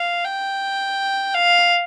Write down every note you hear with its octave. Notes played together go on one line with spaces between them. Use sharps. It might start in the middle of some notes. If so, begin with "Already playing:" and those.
Already playing: F5
G5
F5